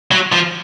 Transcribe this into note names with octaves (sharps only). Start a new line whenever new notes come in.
F#3
F3